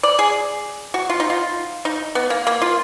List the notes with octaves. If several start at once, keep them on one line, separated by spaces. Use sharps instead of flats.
D5
G#4
F#4
F4
D#4
F4
D#4
B3
A#3
A#3
F4